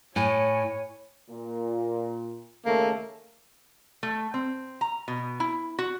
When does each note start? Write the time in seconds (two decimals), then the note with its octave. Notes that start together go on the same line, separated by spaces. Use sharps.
0.16 A2 C#5 G#5
1.30 A#2
2.66 D#2 C#3 A3 A#3
4.03 A3
4.34 C4
4.81 A#5
5.08 B2
5.40 E4
5.79 F#4